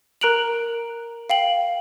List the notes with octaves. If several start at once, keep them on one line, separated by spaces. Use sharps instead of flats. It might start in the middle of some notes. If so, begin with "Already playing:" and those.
A#4 A#5 F#6 D7 F7 F#7
F5 G5 F#7